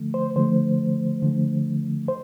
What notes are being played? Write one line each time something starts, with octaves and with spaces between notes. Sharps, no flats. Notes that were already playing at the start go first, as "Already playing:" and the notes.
Already playing: D3 F3 A3
C5
D3 F3 A3 C5
D3 F3 A3
C5